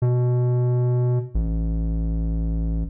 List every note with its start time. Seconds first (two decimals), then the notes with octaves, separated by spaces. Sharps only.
0.02 B2
1.35 A1